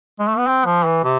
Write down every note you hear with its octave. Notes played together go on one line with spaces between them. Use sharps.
G#3
A3
B3
C4
F3
E3
C3